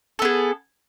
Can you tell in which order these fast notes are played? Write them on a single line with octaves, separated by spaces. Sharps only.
A4 B3 G#4